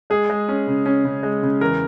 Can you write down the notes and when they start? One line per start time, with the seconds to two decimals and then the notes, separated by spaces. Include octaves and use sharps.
0.10 G#3 G#4
0.30 G#3
0.48 C#4
0.67 C#3
0.86 C#4
1.04 C#3
1.23 G#3
1.43 C#3
1.61 E2 A#4